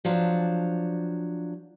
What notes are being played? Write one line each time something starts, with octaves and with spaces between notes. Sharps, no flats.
F3 F#3 D4